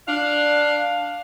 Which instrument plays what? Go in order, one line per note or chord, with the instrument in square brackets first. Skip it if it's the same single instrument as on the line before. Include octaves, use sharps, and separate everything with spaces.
[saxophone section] D4 F5